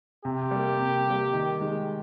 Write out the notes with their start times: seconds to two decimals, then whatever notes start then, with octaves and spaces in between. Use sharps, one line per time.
0.25 C3 G4
0.51 G3 A#3
0.79 C3
1.06 G3 A#3
1.33 D#3
1.61 G#3 D#4